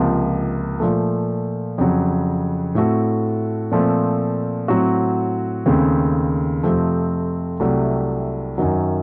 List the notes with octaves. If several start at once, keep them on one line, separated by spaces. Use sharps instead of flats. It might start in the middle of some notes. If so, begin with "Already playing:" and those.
Already playing: C#2 C3 F3 A#3
A#2 F3 A3
F2 C#3 F#3
A2 A3 C4 F#4 A4
A#2 F3 A3 C4
A2 F#3 C4 F#4
D#2 C#3 A3 C4
F2 C3 F3 A3 C4
C2 C3 F#3 A3
F#2 D#3 F#3